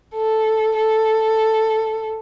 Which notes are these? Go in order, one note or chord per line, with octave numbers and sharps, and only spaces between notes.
A4
A4